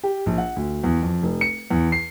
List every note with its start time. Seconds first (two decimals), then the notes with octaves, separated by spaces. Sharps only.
0.03 G4
0.26 A#1
0.38 F#5
0.56 D2
0.84 E2
1.02 F2
1.23 F1
1.41 C#7
1.71 E2
1.92 C7